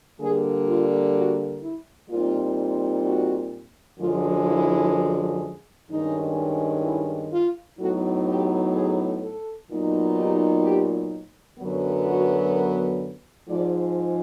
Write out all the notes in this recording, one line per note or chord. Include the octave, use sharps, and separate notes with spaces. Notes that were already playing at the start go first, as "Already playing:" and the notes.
D3 G3 A#3 G#4
F4
F#4
E4
A#2 G3 C4 D#4 F4
F#4
F#2 D3 F3 G#3 F4
E4
G2 D#3 G#3 C#4 D#4
E4
F4
A2 F#3 B3 D#4 F#4
G4
G#4
A4
A#2 F#3 B3 D#4
G4
G4
F#2 D3 F#3 B3
F#4
A#4
G#2 F3 G#3 D5